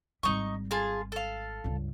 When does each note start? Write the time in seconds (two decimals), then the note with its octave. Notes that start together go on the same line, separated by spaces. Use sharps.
0.23 G#1 G3 D#4 C#6
0.71 F4 G#4 A5
1.12 A4 F5
1.64 C#2 G2